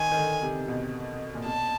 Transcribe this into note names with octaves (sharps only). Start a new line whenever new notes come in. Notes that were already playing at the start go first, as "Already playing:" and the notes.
Already playing: D#3 G#5
D#3
D3
C3
C3
B2
A#2
B2 A5